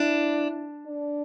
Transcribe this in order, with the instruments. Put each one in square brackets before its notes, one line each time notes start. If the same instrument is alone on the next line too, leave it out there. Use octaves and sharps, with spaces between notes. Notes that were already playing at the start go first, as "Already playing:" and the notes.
Already playing: [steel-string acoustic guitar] D4 [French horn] E4
[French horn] D4